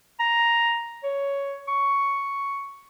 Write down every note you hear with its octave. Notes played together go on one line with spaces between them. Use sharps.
A#5
C#5
C#6